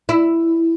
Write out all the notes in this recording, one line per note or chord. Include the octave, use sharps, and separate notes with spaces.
E4